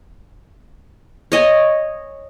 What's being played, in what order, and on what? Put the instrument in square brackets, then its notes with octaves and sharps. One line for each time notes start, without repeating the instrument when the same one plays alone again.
[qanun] C#5 D#5 G#5